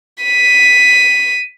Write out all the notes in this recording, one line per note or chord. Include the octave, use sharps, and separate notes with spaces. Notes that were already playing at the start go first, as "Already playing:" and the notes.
B6 D#7